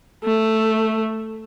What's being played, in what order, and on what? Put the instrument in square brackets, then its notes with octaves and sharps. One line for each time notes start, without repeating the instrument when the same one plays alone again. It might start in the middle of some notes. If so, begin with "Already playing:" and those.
[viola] A3